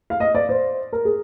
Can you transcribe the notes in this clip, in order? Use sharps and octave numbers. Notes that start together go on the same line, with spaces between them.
F5
D#5
D5
C5
A#4
G#4